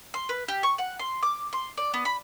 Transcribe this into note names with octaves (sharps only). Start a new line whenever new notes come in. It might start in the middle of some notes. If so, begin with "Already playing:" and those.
C6
B4
G4
C#6
F#5
C6
D6
C6
D5
B3
B5